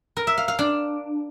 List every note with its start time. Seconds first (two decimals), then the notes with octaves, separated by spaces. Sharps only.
0.17 A#4
0.27 E5
0.38 F5
0.48 F5
0.59 D4